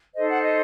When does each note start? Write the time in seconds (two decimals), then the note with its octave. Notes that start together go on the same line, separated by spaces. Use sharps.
0.15 D#4 A4 C5 D#5
0.29 F#5
0.42 D#5